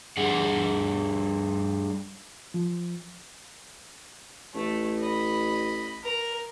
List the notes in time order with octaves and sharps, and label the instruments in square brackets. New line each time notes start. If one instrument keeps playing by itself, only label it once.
[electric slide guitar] G3 D4 G#4 F#5
[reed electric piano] F3
[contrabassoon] A1 [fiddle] A3
[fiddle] D#5 B5
A#4